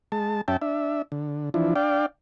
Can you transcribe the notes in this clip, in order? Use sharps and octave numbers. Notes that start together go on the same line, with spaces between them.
G#3 A5
F#2 C#4 E5 G5 A5
D4 E5
D3
E3 F3 D4 E4
D4 D5 F5 G5